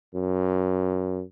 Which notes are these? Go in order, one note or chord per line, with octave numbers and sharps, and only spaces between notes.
F#2